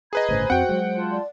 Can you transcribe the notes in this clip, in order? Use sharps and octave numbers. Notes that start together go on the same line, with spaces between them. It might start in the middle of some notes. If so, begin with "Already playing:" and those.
G#4 B4 D#5 A#5 B5 G#6
G1 A2 C#3 C5
F2 C4 F#4 F#5 G5
F#3 G#3
F4 A5 C6
D5